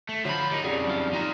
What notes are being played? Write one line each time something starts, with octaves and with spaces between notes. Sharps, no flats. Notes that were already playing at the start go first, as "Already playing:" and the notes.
A3
D3 F3 F#3 B5
D#4 G4 A#4
F2 C#3 G3 G#4
F#3 F4
D#4 F4 F#4 A#5